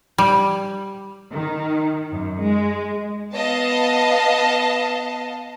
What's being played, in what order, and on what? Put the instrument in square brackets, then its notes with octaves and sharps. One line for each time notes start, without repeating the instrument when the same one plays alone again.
[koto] G3
[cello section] D#3
F#2
G#3
[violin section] B3 D#5 F5 A5